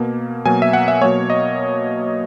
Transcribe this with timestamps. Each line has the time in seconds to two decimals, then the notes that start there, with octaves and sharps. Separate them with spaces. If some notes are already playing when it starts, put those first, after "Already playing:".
Already playing: B2 A#3
0.45 B2 F#3 A#3 G#5
0.62 E5
0.73 F#5
0.88 E5
1.01 B2 F#3 A#3 C#5
1.30 D#5